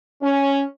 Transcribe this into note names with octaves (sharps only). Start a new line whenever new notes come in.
C#4